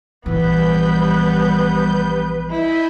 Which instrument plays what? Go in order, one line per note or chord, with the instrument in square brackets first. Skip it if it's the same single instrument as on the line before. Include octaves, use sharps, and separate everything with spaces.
[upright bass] A#1 E3 [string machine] G3 G6 [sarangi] B3 [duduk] B4
[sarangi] E4 [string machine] D#5 G#5 G6